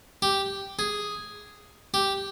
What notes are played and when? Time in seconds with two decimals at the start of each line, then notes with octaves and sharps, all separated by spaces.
0.22 G4
0.79 G#4
1.94 G4